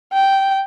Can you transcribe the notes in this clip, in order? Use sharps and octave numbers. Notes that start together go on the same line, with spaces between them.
G5